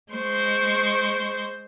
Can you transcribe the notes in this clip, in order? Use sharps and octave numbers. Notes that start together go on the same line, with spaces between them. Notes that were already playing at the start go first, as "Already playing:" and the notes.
G#3 C5 C6 C#6